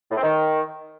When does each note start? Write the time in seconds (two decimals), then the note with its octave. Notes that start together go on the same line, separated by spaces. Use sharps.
0.10 A2
0.16 C4
0.22 D#3